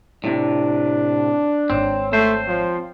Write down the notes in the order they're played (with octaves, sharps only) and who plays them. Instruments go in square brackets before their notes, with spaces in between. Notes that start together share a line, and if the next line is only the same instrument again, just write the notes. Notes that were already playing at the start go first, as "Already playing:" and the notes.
[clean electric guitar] A2 C3 [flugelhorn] D4
[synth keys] G#1 G#2 C#5 [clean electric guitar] C4
[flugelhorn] A3 [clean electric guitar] C4 C5
[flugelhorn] F3